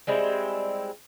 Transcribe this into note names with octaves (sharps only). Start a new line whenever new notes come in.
G3 G#3 C4 E4